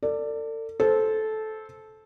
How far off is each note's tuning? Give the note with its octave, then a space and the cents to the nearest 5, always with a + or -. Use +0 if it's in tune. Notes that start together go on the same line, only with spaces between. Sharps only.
A4 +40 D5 +0
A4 -15 C5 +0